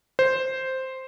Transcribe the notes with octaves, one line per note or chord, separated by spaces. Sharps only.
C5